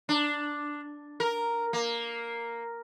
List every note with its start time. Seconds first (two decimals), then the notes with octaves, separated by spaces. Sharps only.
0.09 D4
1.20 A#4
1.73 A#3